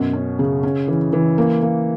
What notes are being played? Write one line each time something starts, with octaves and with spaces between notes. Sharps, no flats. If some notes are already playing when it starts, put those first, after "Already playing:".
Already playing: F#2 B2
C#4
C#3
C#4
E3
E3
A#3
A#3